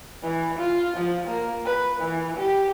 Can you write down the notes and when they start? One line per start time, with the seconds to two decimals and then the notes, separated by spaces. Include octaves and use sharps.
0.23 E3
0.59 F4
0.97 F3
1.28 A#3
1.66 B4
2.00 E3
2.37 G4